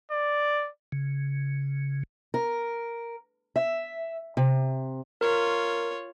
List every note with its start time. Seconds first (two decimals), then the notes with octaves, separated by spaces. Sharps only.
0.12 D5
0.92 C#3
2.34 A#4
3.56 E5
4.37 C3
5.21 F4 A#4 C#5